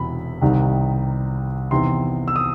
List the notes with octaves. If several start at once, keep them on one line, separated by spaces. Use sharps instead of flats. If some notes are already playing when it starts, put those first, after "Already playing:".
Already playing: E1 E2 C3 B5
C2 C3 D#3 G3
E2 C3 D#3 C6
E6
D#6